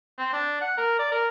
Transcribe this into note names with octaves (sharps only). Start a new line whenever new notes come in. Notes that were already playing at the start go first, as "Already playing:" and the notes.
C4
D4
F#5
A#4
D5
A#4